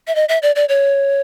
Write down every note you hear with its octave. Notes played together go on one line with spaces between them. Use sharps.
E5
D#5
E5
D5
D5
C#5